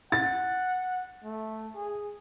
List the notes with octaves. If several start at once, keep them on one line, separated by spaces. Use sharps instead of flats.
F#5 A6
A3
G#4